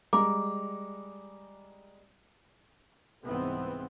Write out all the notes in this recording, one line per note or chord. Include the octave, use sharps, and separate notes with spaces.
G3 G#3 A#5 D6
C2 G#2 E3 B3 C4